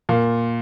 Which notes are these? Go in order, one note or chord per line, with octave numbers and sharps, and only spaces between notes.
A#2 F5